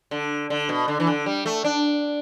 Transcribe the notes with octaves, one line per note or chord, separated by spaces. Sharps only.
D3
D3
B2
D3
E3
D3
G3
A3
D4